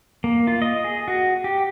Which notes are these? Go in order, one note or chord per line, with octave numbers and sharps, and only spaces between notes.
A#3
F4
D#5
G#4
F#4
G4